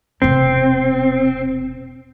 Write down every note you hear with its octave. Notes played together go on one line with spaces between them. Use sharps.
E1 C3 C4